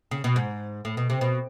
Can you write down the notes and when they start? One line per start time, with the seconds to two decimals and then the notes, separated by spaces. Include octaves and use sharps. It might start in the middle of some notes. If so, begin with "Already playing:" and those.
0.11 C#3
0.24 B2
0.36 G#2
0.85 A2
0.97 B2
1.10 C3
1.21 B2